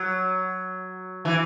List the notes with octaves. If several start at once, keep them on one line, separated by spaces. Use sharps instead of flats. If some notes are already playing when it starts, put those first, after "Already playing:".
Already playing: F#3
E3